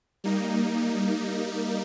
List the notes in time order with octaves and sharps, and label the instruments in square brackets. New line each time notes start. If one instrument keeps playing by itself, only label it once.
[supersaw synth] G3 A#3 D#4